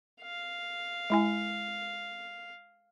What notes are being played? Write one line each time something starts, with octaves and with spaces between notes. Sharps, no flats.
F5
G#3 E4 G#5